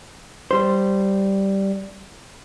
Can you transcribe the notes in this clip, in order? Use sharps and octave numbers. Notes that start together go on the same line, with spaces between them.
G3 C5